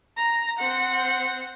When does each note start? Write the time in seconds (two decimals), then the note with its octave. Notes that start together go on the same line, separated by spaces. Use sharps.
0.17 A#5
0.59 C4 F#5